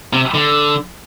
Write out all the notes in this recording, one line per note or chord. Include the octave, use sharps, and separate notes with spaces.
C3
D3